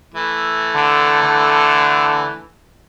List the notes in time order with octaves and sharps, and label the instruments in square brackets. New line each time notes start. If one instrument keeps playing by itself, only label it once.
[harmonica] E3 A3
[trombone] D3
D3